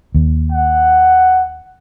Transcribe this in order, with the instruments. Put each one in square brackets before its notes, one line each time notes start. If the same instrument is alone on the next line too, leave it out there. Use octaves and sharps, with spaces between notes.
[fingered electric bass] D#2
[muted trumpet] F#5